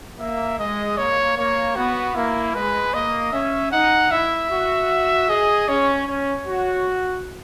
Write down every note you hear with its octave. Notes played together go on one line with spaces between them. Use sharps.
A#3 E5
G#3 D#5
A#3 C#5
A#3 C#5
B3 F#4
A#3 E4
G#3 B4
A#3 D#5
C#4 E5
D#4 F#5
E4 E5
F#4
G#4 D#5
C#4 C#5
C#4 C#5
F#4